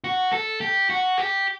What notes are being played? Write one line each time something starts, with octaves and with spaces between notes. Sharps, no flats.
F#4
A4
G4
F#4
G4